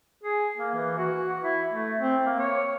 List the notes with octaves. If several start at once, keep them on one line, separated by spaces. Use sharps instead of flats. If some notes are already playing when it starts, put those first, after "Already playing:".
G#4
A#3
E3
F#4
E4
A3
C4
A#3
C#5